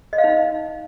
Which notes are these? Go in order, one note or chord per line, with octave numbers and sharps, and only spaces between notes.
D#5
F5
D#4